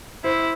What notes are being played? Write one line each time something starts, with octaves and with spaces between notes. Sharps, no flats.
E4 C5